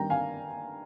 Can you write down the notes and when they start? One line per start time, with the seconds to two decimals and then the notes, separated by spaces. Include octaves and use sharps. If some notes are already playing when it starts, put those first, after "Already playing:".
Already playing: G2 D#3 A#3 G5 A#5
0.10 G1 F5 G#5